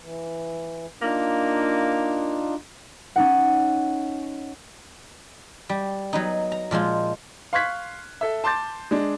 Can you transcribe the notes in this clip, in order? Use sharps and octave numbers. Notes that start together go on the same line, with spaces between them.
E3
A#3 D4 D#4 F4
C#4 D#4 F#5
G3
F#3 B3 D#4
A#5
A#2 F3 G#3 F4
F5 C6 C#6 F#6 G#6 B6
A4 E5
A5 C6 D6 G6 A6
G#3 D4